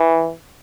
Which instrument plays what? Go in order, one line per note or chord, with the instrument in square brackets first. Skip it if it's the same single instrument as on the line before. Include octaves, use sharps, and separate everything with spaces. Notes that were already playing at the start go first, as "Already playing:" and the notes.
Already playing: [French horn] E3